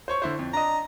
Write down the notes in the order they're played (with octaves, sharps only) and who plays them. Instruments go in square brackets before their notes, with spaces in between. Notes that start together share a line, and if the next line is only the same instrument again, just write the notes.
[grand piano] C5 C#5 C#6
D3 E4 C5
F2
[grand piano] D4 D#5 [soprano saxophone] A#5